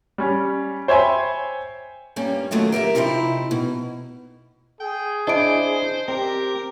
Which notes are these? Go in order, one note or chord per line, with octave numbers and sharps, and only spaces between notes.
G3 C#4
C5 C#5 E5 G5 G#5 B5
G2 G3 A#3 C#4
D#2 F#3 A3 F4 D#5
G4 A#4 D#5 E5
C3 F3 C4 D#4 E4
B2
G#4 G5
D4 E4 C5 D5 D#5 D7
C4 G4 A#4